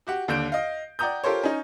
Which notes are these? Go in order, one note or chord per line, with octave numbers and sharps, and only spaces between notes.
F#4 G4 F#5
D#2 D3 G6 D7
D#5 F5
D5 F#5 G5 A#5 D#6 G6
F4 G4 A4 A#4 C5 C#5
C#4 D#4